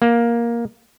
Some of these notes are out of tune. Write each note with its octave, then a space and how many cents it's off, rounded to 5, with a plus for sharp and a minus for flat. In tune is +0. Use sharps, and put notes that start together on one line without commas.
A#3 +10